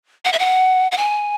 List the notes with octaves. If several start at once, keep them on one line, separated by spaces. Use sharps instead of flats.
F#5
E5
F#5
F#5
G#5